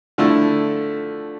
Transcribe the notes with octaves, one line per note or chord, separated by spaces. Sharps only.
D3 F3 A3 E4